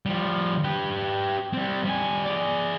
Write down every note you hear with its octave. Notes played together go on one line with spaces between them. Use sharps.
F3 G3
G4 B4
G3 C4
G3 G#5
G#4 D5